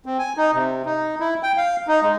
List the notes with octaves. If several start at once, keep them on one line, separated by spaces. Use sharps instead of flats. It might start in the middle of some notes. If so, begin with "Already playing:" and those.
C4
G#5
D#4
C3
D#4
E4
G5
F5
D#4
G#3